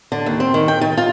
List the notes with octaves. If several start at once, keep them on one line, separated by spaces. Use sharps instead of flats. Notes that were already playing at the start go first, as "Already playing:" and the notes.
D3
D#2
C4
D#3
G5
D#3
F4